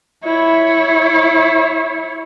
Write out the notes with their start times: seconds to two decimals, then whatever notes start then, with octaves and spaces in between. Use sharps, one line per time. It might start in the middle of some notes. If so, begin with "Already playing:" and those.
0.24 E4 C#5